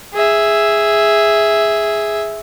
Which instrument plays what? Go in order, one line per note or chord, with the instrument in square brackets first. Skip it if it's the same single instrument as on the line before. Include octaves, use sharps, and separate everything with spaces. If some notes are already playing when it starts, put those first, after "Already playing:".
[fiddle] G#4 E5